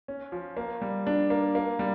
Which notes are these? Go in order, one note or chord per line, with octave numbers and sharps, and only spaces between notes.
C#4
F3
A#3
G3
D4
A#3
A#3
G3